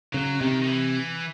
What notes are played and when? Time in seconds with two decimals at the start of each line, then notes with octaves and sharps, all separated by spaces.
0.13 C#3 F#3
0.41 C3 D#3
0.62 D#3
0.67 E3